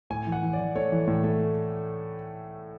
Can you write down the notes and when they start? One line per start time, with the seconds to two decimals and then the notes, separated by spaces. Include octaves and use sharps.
0.10 A2 G#5
0.27 E3
0.32 F#5
0.43 E3
0.53 D5
0.59 E3
0.75 A3 C#5
0.92 E3
1.07 A2
1.24 A3